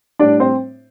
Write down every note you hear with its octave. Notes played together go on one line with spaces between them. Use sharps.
A2 G3 D4 D5
C4 C5